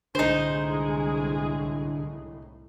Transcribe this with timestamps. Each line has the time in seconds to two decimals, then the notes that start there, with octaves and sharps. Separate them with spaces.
0.15 C2 A2 D3 G#3 D#4 G#4 C5